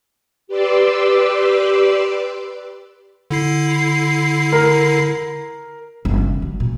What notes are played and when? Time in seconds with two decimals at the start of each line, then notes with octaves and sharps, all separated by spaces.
0.47 G4 B4 D5 C6 D6 E6
3.31 D3 E4 C7
4.53 A#4
6.05 G1
6.18 C#3
6.42 F#3
6.60 A#2